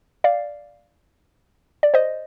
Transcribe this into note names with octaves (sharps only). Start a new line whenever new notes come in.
D5 F5
D5
C5 D#5